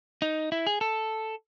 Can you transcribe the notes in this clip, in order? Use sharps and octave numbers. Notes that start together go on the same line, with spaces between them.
D#4
E4
G#4
A4